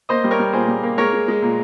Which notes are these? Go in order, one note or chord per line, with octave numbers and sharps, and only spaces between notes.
A#3 C5 D#5
G3
A#4 C#5
G3
A#2 G#4 C5
G3
A#3
G#3 A#4 C#5
G#3
G#3
A#2